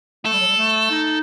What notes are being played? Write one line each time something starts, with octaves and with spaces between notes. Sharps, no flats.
A3 A4
G3
F#3
G3
A3
D#4